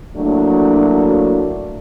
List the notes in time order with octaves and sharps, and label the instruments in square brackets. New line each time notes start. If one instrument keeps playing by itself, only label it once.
[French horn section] F#3 A3 A#3 D4 E4 F#4